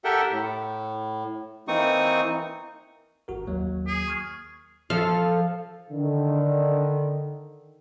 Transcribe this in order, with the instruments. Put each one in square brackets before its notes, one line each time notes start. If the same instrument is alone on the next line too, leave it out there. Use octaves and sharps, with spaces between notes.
[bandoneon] G4 A4 A#4 E5 F#5 G5
A2
E3 A#3 C4 D#4 C#6 D#6
[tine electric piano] G#1 F#4 A#4
D#2 F#3 A#3
[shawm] G#4
[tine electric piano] C#6 F6 G#6
[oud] F3 [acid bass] A4 [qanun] F5
[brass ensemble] D3 D#3